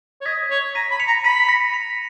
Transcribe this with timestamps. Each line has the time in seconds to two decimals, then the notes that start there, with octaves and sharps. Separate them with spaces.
0.21 C#5
0.26 D#5 G#6 B6
0.50 C#5
0.75 A#5 B6 D#7
0.91 B5
1.00 C#7 F7
1.07 A#5
1.24 B5 B6 D#7
1.49 A#6 C#7
1.73 C#7 F7